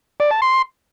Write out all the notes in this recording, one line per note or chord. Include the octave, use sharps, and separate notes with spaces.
D5
A5
C6